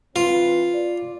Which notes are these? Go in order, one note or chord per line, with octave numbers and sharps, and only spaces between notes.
E3 C4 F4 B4
D5